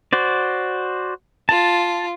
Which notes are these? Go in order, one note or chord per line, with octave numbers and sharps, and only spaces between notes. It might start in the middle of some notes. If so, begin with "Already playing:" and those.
F#4 C5 D5
F4 A5